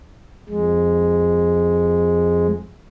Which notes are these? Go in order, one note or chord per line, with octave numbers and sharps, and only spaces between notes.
F2 G#3